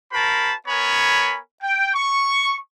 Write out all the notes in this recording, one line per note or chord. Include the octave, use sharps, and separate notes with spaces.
F#4 A#4 C5 A5 B5
B3 A#4 C#5 G#5 B5
G5
C#6